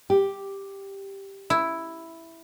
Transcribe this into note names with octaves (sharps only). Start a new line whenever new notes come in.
G4
E4